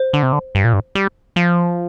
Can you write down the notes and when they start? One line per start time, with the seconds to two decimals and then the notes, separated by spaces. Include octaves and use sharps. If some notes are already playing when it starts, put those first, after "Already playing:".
Already playing: C5
0.13 D3
0.23 C3
0.33 D3
0.55 G2
0.64 A#2
0.73 G2
0.95 G3
1.36 F3